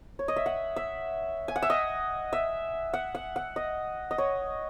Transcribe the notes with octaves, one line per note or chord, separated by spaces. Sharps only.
C#5
D#5
E5
F#5
E5
G#5
F#5
E5
D#5
E5
F#5
F#5
F#5
D#5
D#5
C#5